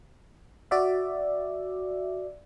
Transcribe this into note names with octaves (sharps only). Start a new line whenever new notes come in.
F#4 D5 E5